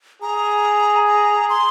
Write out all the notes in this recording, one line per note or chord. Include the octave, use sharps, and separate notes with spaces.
G#4 A#5
A#5
C6